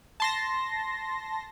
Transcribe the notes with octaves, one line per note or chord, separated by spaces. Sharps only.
A5 C6 A#6